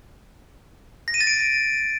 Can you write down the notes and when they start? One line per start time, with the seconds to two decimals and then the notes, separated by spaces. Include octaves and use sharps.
1.08 A#6
1.14 D#7
1.21 A6
1.27 D7